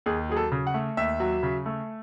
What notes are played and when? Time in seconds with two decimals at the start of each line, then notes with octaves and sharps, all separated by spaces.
0.06 D#2 G#4
0.29 F#3 G#4
0.37 A4
0.52 C#3
0.67 F#5
0.74 A3
0.97 D#2 E5
1.20 F#3
1.43 C#3
1.66 A3